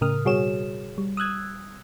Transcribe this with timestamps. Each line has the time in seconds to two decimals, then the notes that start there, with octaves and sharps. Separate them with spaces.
0.01 A2 C#3 A#4 D#6 F6
0.25 B2 G3 F#4 G#4 C#5 E7
0.98 G3
1.17 D#6 E6 F#6 G#6